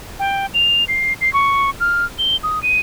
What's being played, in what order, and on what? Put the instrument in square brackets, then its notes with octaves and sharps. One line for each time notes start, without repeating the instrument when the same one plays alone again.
[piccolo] G5
F7
C7
C7
C#6
F6
G7
D#6
D#7